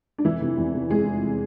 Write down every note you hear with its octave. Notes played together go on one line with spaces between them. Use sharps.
D4
F1 E3 E4
C3
E2
C3
F1 G#3 G#4
F1